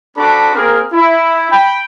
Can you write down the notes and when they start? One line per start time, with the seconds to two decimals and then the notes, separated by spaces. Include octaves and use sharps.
0.17 C4 D4 F#4 A4 B5 D6
0.55 A#3 C4 G#4 A#4
0.93 E4
1.51 G5 B5